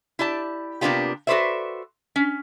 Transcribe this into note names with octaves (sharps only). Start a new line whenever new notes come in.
E4 G4 D5 A5
C3 A#3 B3 D4 F4 G4
F#4 A4 B4 C5 D5 E5
C#4